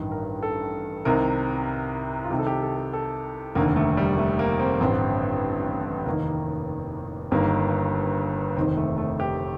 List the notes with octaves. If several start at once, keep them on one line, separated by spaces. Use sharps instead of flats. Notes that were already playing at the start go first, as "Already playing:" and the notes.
Already playing: A1 G2 D#3
A#4
A4
C2 C3 D#3 A#4
F4
C2 C3 D#3 G4
A4
G4
A4
A4
A4
F1 D#2 D3 A#3
A3
G3
A3
A#3
C4
A1 G2 D3 C4
F1 D#2 D#3 A#3
G1 G2 D#3 A#3
F1 D#2 D#3 C4
A3
A3
G4